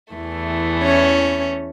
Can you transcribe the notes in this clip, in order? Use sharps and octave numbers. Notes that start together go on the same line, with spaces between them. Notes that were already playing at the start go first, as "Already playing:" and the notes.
E2 E3 A3
C#4